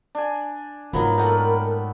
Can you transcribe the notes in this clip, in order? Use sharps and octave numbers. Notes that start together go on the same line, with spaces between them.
D4 G#5
G#2 F3 F#3 B3 D#4 A#4 B5
A3 D#4 A4 F#5 G5 B5